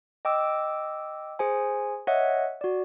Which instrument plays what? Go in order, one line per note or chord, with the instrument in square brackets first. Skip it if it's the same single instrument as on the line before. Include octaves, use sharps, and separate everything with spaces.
[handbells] D#5 G5 D6 E6
G#4 C5 G#5
C#5 D#5 E5 F#5
F#4 D5